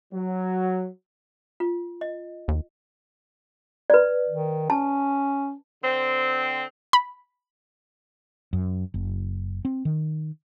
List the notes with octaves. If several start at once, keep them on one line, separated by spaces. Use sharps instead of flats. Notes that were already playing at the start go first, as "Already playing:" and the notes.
F#3
F4
D#5
D#2
B4 D5
D#3
C#4 A5
D3 C4
B5
F#2
F#1
C4
D#3